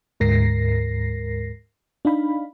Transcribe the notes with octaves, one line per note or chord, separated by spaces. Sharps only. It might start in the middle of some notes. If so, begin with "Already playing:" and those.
D2 G#2 A#4 A#6 C7
D4 D#4 F5 B5